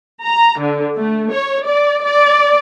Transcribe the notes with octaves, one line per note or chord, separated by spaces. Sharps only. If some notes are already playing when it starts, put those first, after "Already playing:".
A#5
D3
A3
C#5
D5
D5